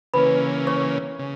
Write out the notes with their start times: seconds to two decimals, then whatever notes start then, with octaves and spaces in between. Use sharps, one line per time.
0.14 C#3 E3 A#3 C#4 B4 B5
0.67 C#5 C#6
1.19 C#3